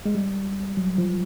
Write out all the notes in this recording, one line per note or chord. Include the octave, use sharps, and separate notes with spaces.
G#3
G3
F#3
F3